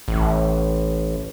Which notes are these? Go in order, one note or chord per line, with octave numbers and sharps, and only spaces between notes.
A1